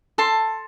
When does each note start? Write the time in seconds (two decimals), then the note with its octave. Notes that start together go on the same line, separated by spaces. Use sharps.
0.18 A4 A5 C6